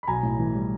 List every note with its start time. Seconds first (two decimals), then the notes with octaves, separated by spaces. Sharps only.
0.03 B5
0.07 B1 G#5 A#5
0.23 A2
0.39 E3
0.55 G3